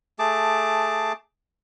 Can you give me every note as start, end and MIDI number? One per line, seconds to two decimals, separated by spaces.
0.19 1.13 57
0.19 1.13 68
0.19 1.13 81
0.19 1.13 86